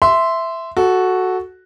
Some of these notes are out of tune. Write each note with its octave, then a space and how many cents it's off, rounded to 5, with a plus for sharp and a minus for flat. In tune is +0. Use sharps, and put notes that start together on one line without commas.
E5 +0 C6 -10
F#4 +0 A4 -10